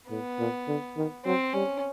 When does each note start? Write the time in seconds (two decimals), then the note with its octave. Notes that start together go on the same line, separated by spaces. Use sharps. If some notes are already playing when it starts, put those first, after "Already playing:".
0.10 A2 B3
0.39 A#2
0.68 D3
0.97 D#3
1.25 F#3 C4
1.53 G3 C#4